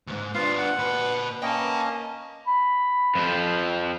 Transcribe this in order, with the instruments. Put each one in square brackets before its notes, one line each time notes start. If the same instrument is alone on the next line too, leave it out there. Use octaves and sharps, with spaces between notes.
[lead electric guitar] D2 G#2
[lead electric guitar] B3 D4 [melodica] F4 F5
[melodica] F#5
[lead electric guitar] A#2 B4
[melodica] A#3 C#4 D#5 [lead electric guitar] G5 A5
[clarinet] B5
[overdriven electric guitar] F2 F3